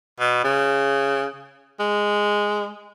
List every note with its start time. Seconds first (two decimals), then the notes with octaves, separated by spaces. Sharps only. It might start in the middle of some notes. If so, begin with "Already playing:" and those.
0.20 B2
0.44 C#3
1.80 G#3